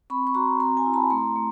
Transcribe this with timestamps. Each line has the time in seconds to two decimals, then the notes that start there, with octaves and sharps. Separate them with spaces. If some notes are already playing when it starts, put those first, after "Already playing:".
0.10 C4 B5 C#6
0.27 C#6
0.34 F#4 A#5 C6
0.60 C4 A#5 C6
0.77 G#5 A#5
0.86 E4
0.94 A5 B5
1.10 A3 A#5 C6
1.36 A3